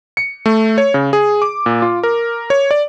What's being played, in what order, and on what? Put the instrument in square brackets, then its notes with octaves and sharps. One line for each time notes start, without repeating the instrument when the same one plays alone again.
[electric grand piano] C#7
A3
C#5
C#3
G#4
D6
A#2
F4
A#4
C#5
D5